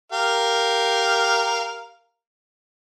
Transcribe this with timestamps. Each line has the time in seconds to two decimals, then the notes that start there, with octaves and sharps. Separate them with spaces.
0.12 G4 A#4 F5